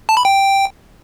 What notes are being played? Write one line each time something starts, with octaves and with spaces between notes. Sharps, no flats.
A5
B5
G5